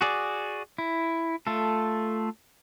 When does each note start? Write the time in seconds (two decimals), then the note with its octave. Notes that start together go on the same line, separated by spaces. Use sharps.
0.01 F#4 G#4 D5
0.78 E4
1.47 A3 F4 A4